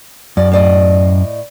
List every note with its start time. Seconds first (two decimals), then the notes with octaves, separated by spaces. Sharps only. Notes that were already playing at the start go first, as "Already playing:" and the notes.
0.37 F#2 D5
0.52 A2 D5 D#5